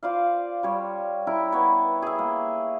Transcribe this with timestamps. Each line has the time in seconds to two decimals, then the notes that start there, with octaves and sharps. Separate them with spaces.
0.03 F4 C5 D5 F5
0.63 G3 C#5
1.27 E4 A#4 B5
1.52 B3 C#5
2.02 G#4 E5
2.19 A#3